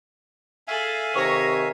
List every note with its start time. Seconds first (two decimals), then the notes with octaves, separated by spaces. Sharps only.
0.68 G#4 A4 E5 F5 G#5
1.15 C3 D#3 C#5 C#6 A#6